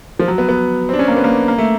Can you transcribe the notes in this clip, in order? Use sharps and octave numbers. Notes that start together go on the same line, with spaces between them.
F3
F#3
B3
B3
C4 D4
C#4
A#3
B3
A#3
A#3
A3